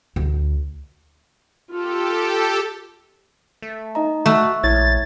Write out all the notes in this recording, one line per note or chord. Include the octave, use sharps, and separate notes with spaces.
D2
F4 G4 A4
A3
D#4 D#5 A#5
A3 F#4 C#6 E6 F#6
A#1 E4 C#5 G#6 A6